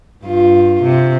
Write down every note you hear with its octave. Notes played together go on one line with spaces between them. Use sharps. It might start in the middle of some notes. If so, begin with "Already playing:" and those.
G2 F4
C3